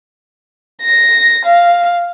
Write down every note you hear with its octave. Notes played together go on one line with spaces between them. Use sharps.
A#6
F5